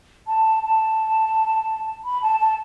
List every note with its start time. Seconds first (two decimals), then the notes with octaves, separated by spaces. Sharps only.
0.27 A5
0.63 A5
2.05 B5
2.22 A5
2.40 A5